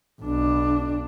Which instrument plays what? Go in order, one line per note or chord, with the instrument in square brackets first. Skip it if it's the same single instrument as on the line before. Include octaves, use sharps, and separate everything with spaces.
[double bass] B1 D4